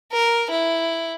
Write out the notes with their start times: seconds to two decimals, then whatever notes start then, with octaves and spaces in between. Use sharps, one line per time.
0.12 A#4
0.50 E4